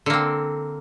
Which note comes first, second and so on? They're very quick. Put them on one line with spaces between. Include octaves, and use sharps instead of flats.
D3 A#3 C4